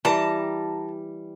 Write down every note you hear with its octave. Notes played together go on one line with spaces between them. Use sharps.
E3 G3 A5 A#5